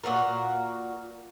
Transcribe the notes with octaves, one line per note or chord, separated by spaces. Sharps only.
A#2 E3 F#4 A#4